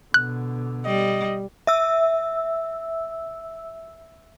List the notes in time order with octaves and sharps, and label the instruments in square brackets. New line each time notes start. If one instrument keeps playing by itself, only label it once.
[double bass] B2 D3 [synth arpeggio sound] F#6
[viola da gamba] G3 [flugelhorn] D#5
[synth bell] E5 E6